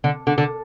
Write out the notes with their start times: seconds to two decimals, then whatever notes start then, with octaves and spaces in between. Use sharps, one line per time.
0.04 D3
0.27 D3
0.38 D3